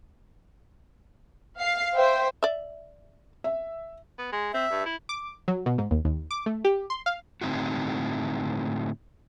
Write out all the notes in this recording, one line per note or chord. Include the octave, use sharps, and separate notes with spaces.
F5 C7
C5 E5 G5
D5 E5
E5
B3
G#3
C4 E5
G2
E4
D6
F#3
B2
G#2
D#2
D#2
D6
A3
G4
C6
F5
A2 D3 C4 D#4 E4 F#4